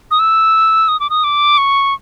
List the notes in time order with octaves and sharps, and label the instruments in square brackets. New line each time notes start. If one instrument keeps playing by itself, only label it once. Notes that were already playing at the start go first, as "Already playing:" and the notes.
[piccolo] D#6
E6
D#6
D6
D#6
D6
C#6